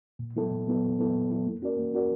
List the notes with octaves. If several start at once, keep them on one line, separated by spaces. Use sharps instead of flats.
A#2
F#3 B3 E4 A4
A#2
F#3 B3 E4 A4
A#2
F#3 B3 E4 A4
A#2
F#3 B3 E4 A4
A#3
C#4 F#4 A#4 D5
A#3
C#4 F#4 A#4 D5